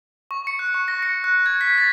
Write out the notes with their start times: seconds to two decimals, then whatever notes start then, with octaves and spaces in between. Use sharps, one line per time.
0.31 C#6
0.47 C#7
0.59 F#6
0.74 C#6
0.88 A#6
1.03 C#7
1.24 F#6
1.46 G#6
1.61 B6
1.78 A6